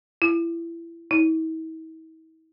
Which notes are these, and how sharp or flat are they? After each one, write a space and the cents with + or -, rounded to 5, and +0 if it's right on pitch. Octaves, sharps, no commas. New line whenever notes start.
E4 +25
E4 -45